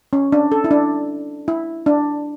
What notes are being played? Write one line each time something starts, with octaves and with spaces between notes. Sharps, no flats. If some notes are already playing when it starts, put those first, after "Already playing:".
C#4
D4
A4
E4
D4
E4
D4